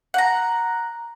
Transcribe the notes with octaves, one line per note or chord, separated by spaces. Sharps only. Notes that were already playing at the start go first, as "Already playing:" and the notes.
F#5 A#5